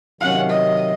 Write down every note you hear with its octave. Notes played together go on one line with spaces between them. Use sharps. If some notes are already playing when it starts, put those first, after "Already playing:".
C3 D#3 F#3 C#4 F5 F#5
D#5